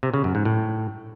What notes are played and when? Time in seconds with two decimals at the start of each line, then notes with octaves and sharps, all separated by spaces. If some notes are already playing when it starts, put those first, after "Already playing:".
0.03 C3
0.14 C#3
0.24 F#2
0.35 G#2
0.45 A2